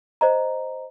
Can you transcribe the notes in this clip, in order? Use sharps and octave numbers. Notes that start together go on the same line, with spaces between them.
C5 D#5 A#5